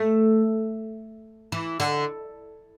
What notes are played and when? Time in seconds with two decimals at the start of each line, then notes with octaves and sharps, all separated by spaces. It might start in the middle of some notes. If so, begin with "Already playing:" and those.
Already playing: A3
1.52 E3
1.80 D3